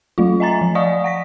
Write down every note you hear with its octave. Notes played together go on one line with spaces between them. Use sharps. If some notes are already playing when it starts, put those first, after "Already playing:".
F#3 A3 F4
D#5 E5 G#5 A#5 A6
F3
D5 D#5 F5 G#5 C#6 D#6
F#5 A#6 B6